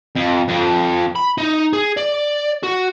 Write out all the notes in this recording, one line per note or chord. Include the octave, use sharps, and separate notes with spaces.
F2
F2
B5
D#4
G#4
D5
F#4